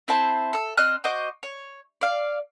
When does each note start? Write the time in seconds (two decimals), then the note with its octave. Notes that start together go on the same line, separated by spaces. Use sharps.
0.08 C4 E4 C5 A5
0.53 A4 E6
0.77 C4 D#5 F6 F#6
1.04 F#4 C5 D#5 D6
1.43 C#5
2.01 D5 F5